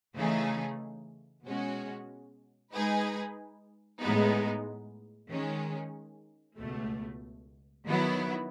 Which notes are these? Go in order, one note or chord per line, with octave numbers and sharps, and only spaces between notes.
C#3 E3 A3 D#4 G#4
B2 G#3 C#4 F#4
G#3 D#4 G#4 B4
A2 G#3 B3 D#4
D#3 G#3 C#4
C#2 B2 A3
D#3 F#3 B3 E4